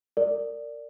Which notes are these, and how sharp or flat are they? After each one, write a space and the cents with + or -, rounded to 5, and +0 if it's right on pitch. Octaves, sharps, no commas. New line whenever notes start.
A#4 -25 D5 +0